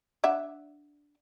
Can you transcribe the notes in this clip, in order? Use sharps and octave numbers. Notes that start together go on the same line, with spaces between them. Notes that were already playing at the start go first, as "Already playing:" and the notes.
D4 E5 F#5